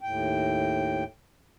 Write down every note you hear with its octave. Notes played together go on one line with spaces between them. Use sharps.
D#2 A2 G5